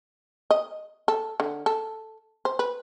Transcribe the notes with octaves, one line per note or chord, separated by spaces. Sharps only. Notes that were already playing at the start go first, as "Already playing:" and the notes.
D#5
A4
D3
A4
C5
B4